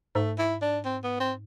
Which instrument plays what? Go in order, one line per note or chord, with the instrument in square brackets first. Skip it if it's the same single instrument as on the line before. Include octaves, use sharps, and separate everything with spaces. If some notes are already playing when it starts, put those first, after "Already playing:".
[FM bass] G#2 [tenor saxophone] A3
[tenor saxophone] E4
D4
C4
B3
C4